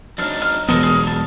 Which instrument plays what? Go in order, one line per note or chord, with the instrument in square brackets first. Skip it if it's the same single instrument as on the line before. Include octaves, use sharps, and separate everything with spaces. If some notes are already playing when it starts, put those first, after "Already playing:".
[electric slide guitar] F#3 C4 D#4 [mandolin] D4 F6
[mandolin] F6
[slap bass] E1 E3 B3 [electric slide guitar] F#3 G#3 [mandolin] D#4 A4 A#4
[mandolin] G#4 F5
A5